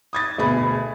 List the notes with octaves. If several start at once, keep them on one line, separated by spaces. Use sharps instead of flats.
D#6 G#6 A6
D2 B2 G#4 B5